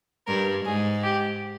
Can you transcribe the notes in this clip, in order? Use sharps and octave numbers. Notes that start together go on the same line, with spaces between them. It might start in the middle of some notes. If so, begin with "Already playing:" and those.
G2 A#4
G#2 G#4
G4